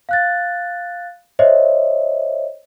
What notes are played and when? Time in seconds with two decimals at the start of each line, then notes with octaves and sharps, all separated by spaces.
0.09 F5 F#6 A6
1.39 C5 C#5 D#5 E5